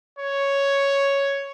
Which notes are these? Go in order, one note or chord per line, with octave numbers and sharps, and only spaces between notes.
C#5